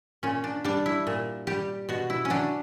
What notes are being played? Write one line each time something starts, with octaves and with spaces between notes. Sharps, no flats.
A#2 C#4
D4
G3 D4
E4
A#2
G3 G4
B2 F#4
E4
C#4
F#3 D4